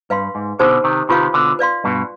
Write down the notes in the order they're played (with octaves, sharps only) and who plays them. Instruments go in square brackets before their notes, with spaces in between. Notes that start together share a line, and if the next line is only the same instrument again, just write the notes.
[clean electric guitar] G2 [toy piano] B4 F5 C6
[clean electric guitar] G#2
[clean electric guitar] B2 D3 [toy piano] D#4 G4 C5
[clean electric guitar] C3 D#3
[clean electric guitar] C3 D#3 [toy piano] F4 B4 F5
[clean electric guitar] B2 D3
[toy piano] B4 D5 F5 C6
[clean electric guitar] G2 B2